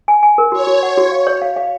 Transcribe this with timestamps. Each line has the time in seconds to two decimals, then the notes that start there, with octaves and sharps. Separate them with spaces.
0.08 G#5
0.23 G#5
0.38 A#4
0.52 F#4 C#5
0.67 F#4
0.83 F#5
0.98 F#4
1.12 F5
1.27 C#5
1.42 F5
1.56 F5